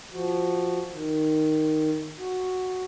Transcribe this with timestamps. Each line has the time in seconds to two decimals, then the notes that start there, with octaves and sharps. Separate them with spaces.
0.14 F3 F#4
0.92 D#3
2.19 F#4